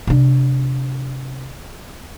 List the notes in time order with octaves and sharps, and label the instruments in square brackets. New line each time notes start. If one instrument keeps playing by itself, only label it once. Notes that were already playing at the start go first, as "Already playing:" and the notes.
[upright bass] C3 D4